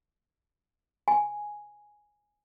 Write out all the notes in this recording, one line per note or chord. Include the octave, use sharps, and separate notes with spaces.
G#5